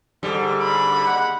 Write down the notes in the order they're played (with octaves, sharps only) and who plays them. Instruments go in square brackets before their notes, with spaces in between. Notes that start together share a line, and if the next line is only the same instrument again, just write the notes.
[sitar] G#2 G3 [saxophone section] D3
[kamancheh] B5
[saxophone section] D#2 G#3 F#5